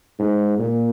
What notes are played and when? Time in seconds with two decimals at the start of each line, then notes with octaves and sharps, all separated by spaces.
0.19 G#2
0.59 A#2